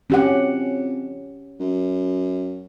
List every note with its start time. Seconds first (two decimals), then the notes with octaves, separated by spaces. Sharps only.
0.10 F2 C#4 G4 F#5
1.60 F#2